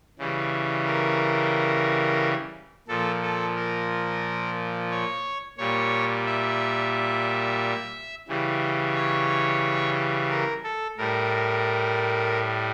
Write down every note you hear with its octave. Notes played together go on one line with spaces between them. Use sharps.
C#3 E3 G3
A#4
A#2 F3 A4
A4
A#4
C#5
A#2 G3 C#5
E5
C#3 E3 G3
C#5
A#4
A4
A2 G3 A#4